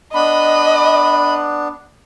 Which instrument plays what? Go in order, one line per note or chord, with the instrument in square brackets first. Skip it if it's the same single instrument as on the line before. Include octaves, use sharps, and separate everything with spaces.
[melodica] B3 D4 [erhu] D#5 [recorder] B5